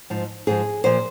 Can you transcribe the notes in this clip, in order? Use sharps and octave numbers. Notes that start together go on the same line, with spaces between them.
G#2 F3
G#2 F3 G#4
A#2 F3 C5